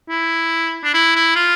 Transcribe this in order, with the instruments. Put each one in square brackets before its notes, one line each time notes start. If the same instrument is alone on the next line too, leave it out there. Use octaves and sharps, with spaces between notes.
[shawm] E4
D4
E4
E4
F4